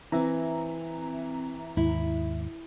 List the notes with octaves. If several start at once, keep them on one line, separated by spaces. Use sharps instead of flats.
E3 C4 E5 A#5
D#2 G#2 E4